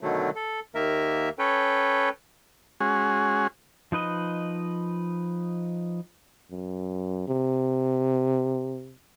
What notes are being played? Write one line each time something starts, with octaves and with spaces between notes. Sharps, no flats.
B2 D3 D#3 F#3 A3
A4
D#2 D#3 A#3 A#4 E5
C#4 A4 B4 C#5 G5
G#3 C#4 F#4 G#4
F3 D#4 B4 D#5
F#2
C3